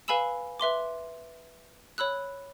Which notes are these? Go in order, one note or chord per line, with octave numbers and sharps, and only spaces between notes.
B4 F5 G#5 B5 E6 E7
B4 E5 C6 D6
C#5 B5 E6 F#6